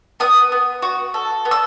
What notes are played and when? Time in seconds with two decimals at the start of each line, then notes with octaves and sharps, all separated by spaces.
0.20 B3 D#6
0.52 B3
0.82 F#4
1.14 A4
1.45 B3
1.51 E6